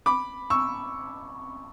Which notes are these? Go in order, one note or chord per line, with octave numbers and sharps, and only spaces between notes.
B5 D6
C#6 E6